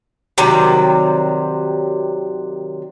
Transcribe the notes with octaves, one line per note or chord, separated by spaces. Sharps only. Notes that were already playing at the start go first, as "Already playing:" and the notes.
C3 D#3 F#3 G3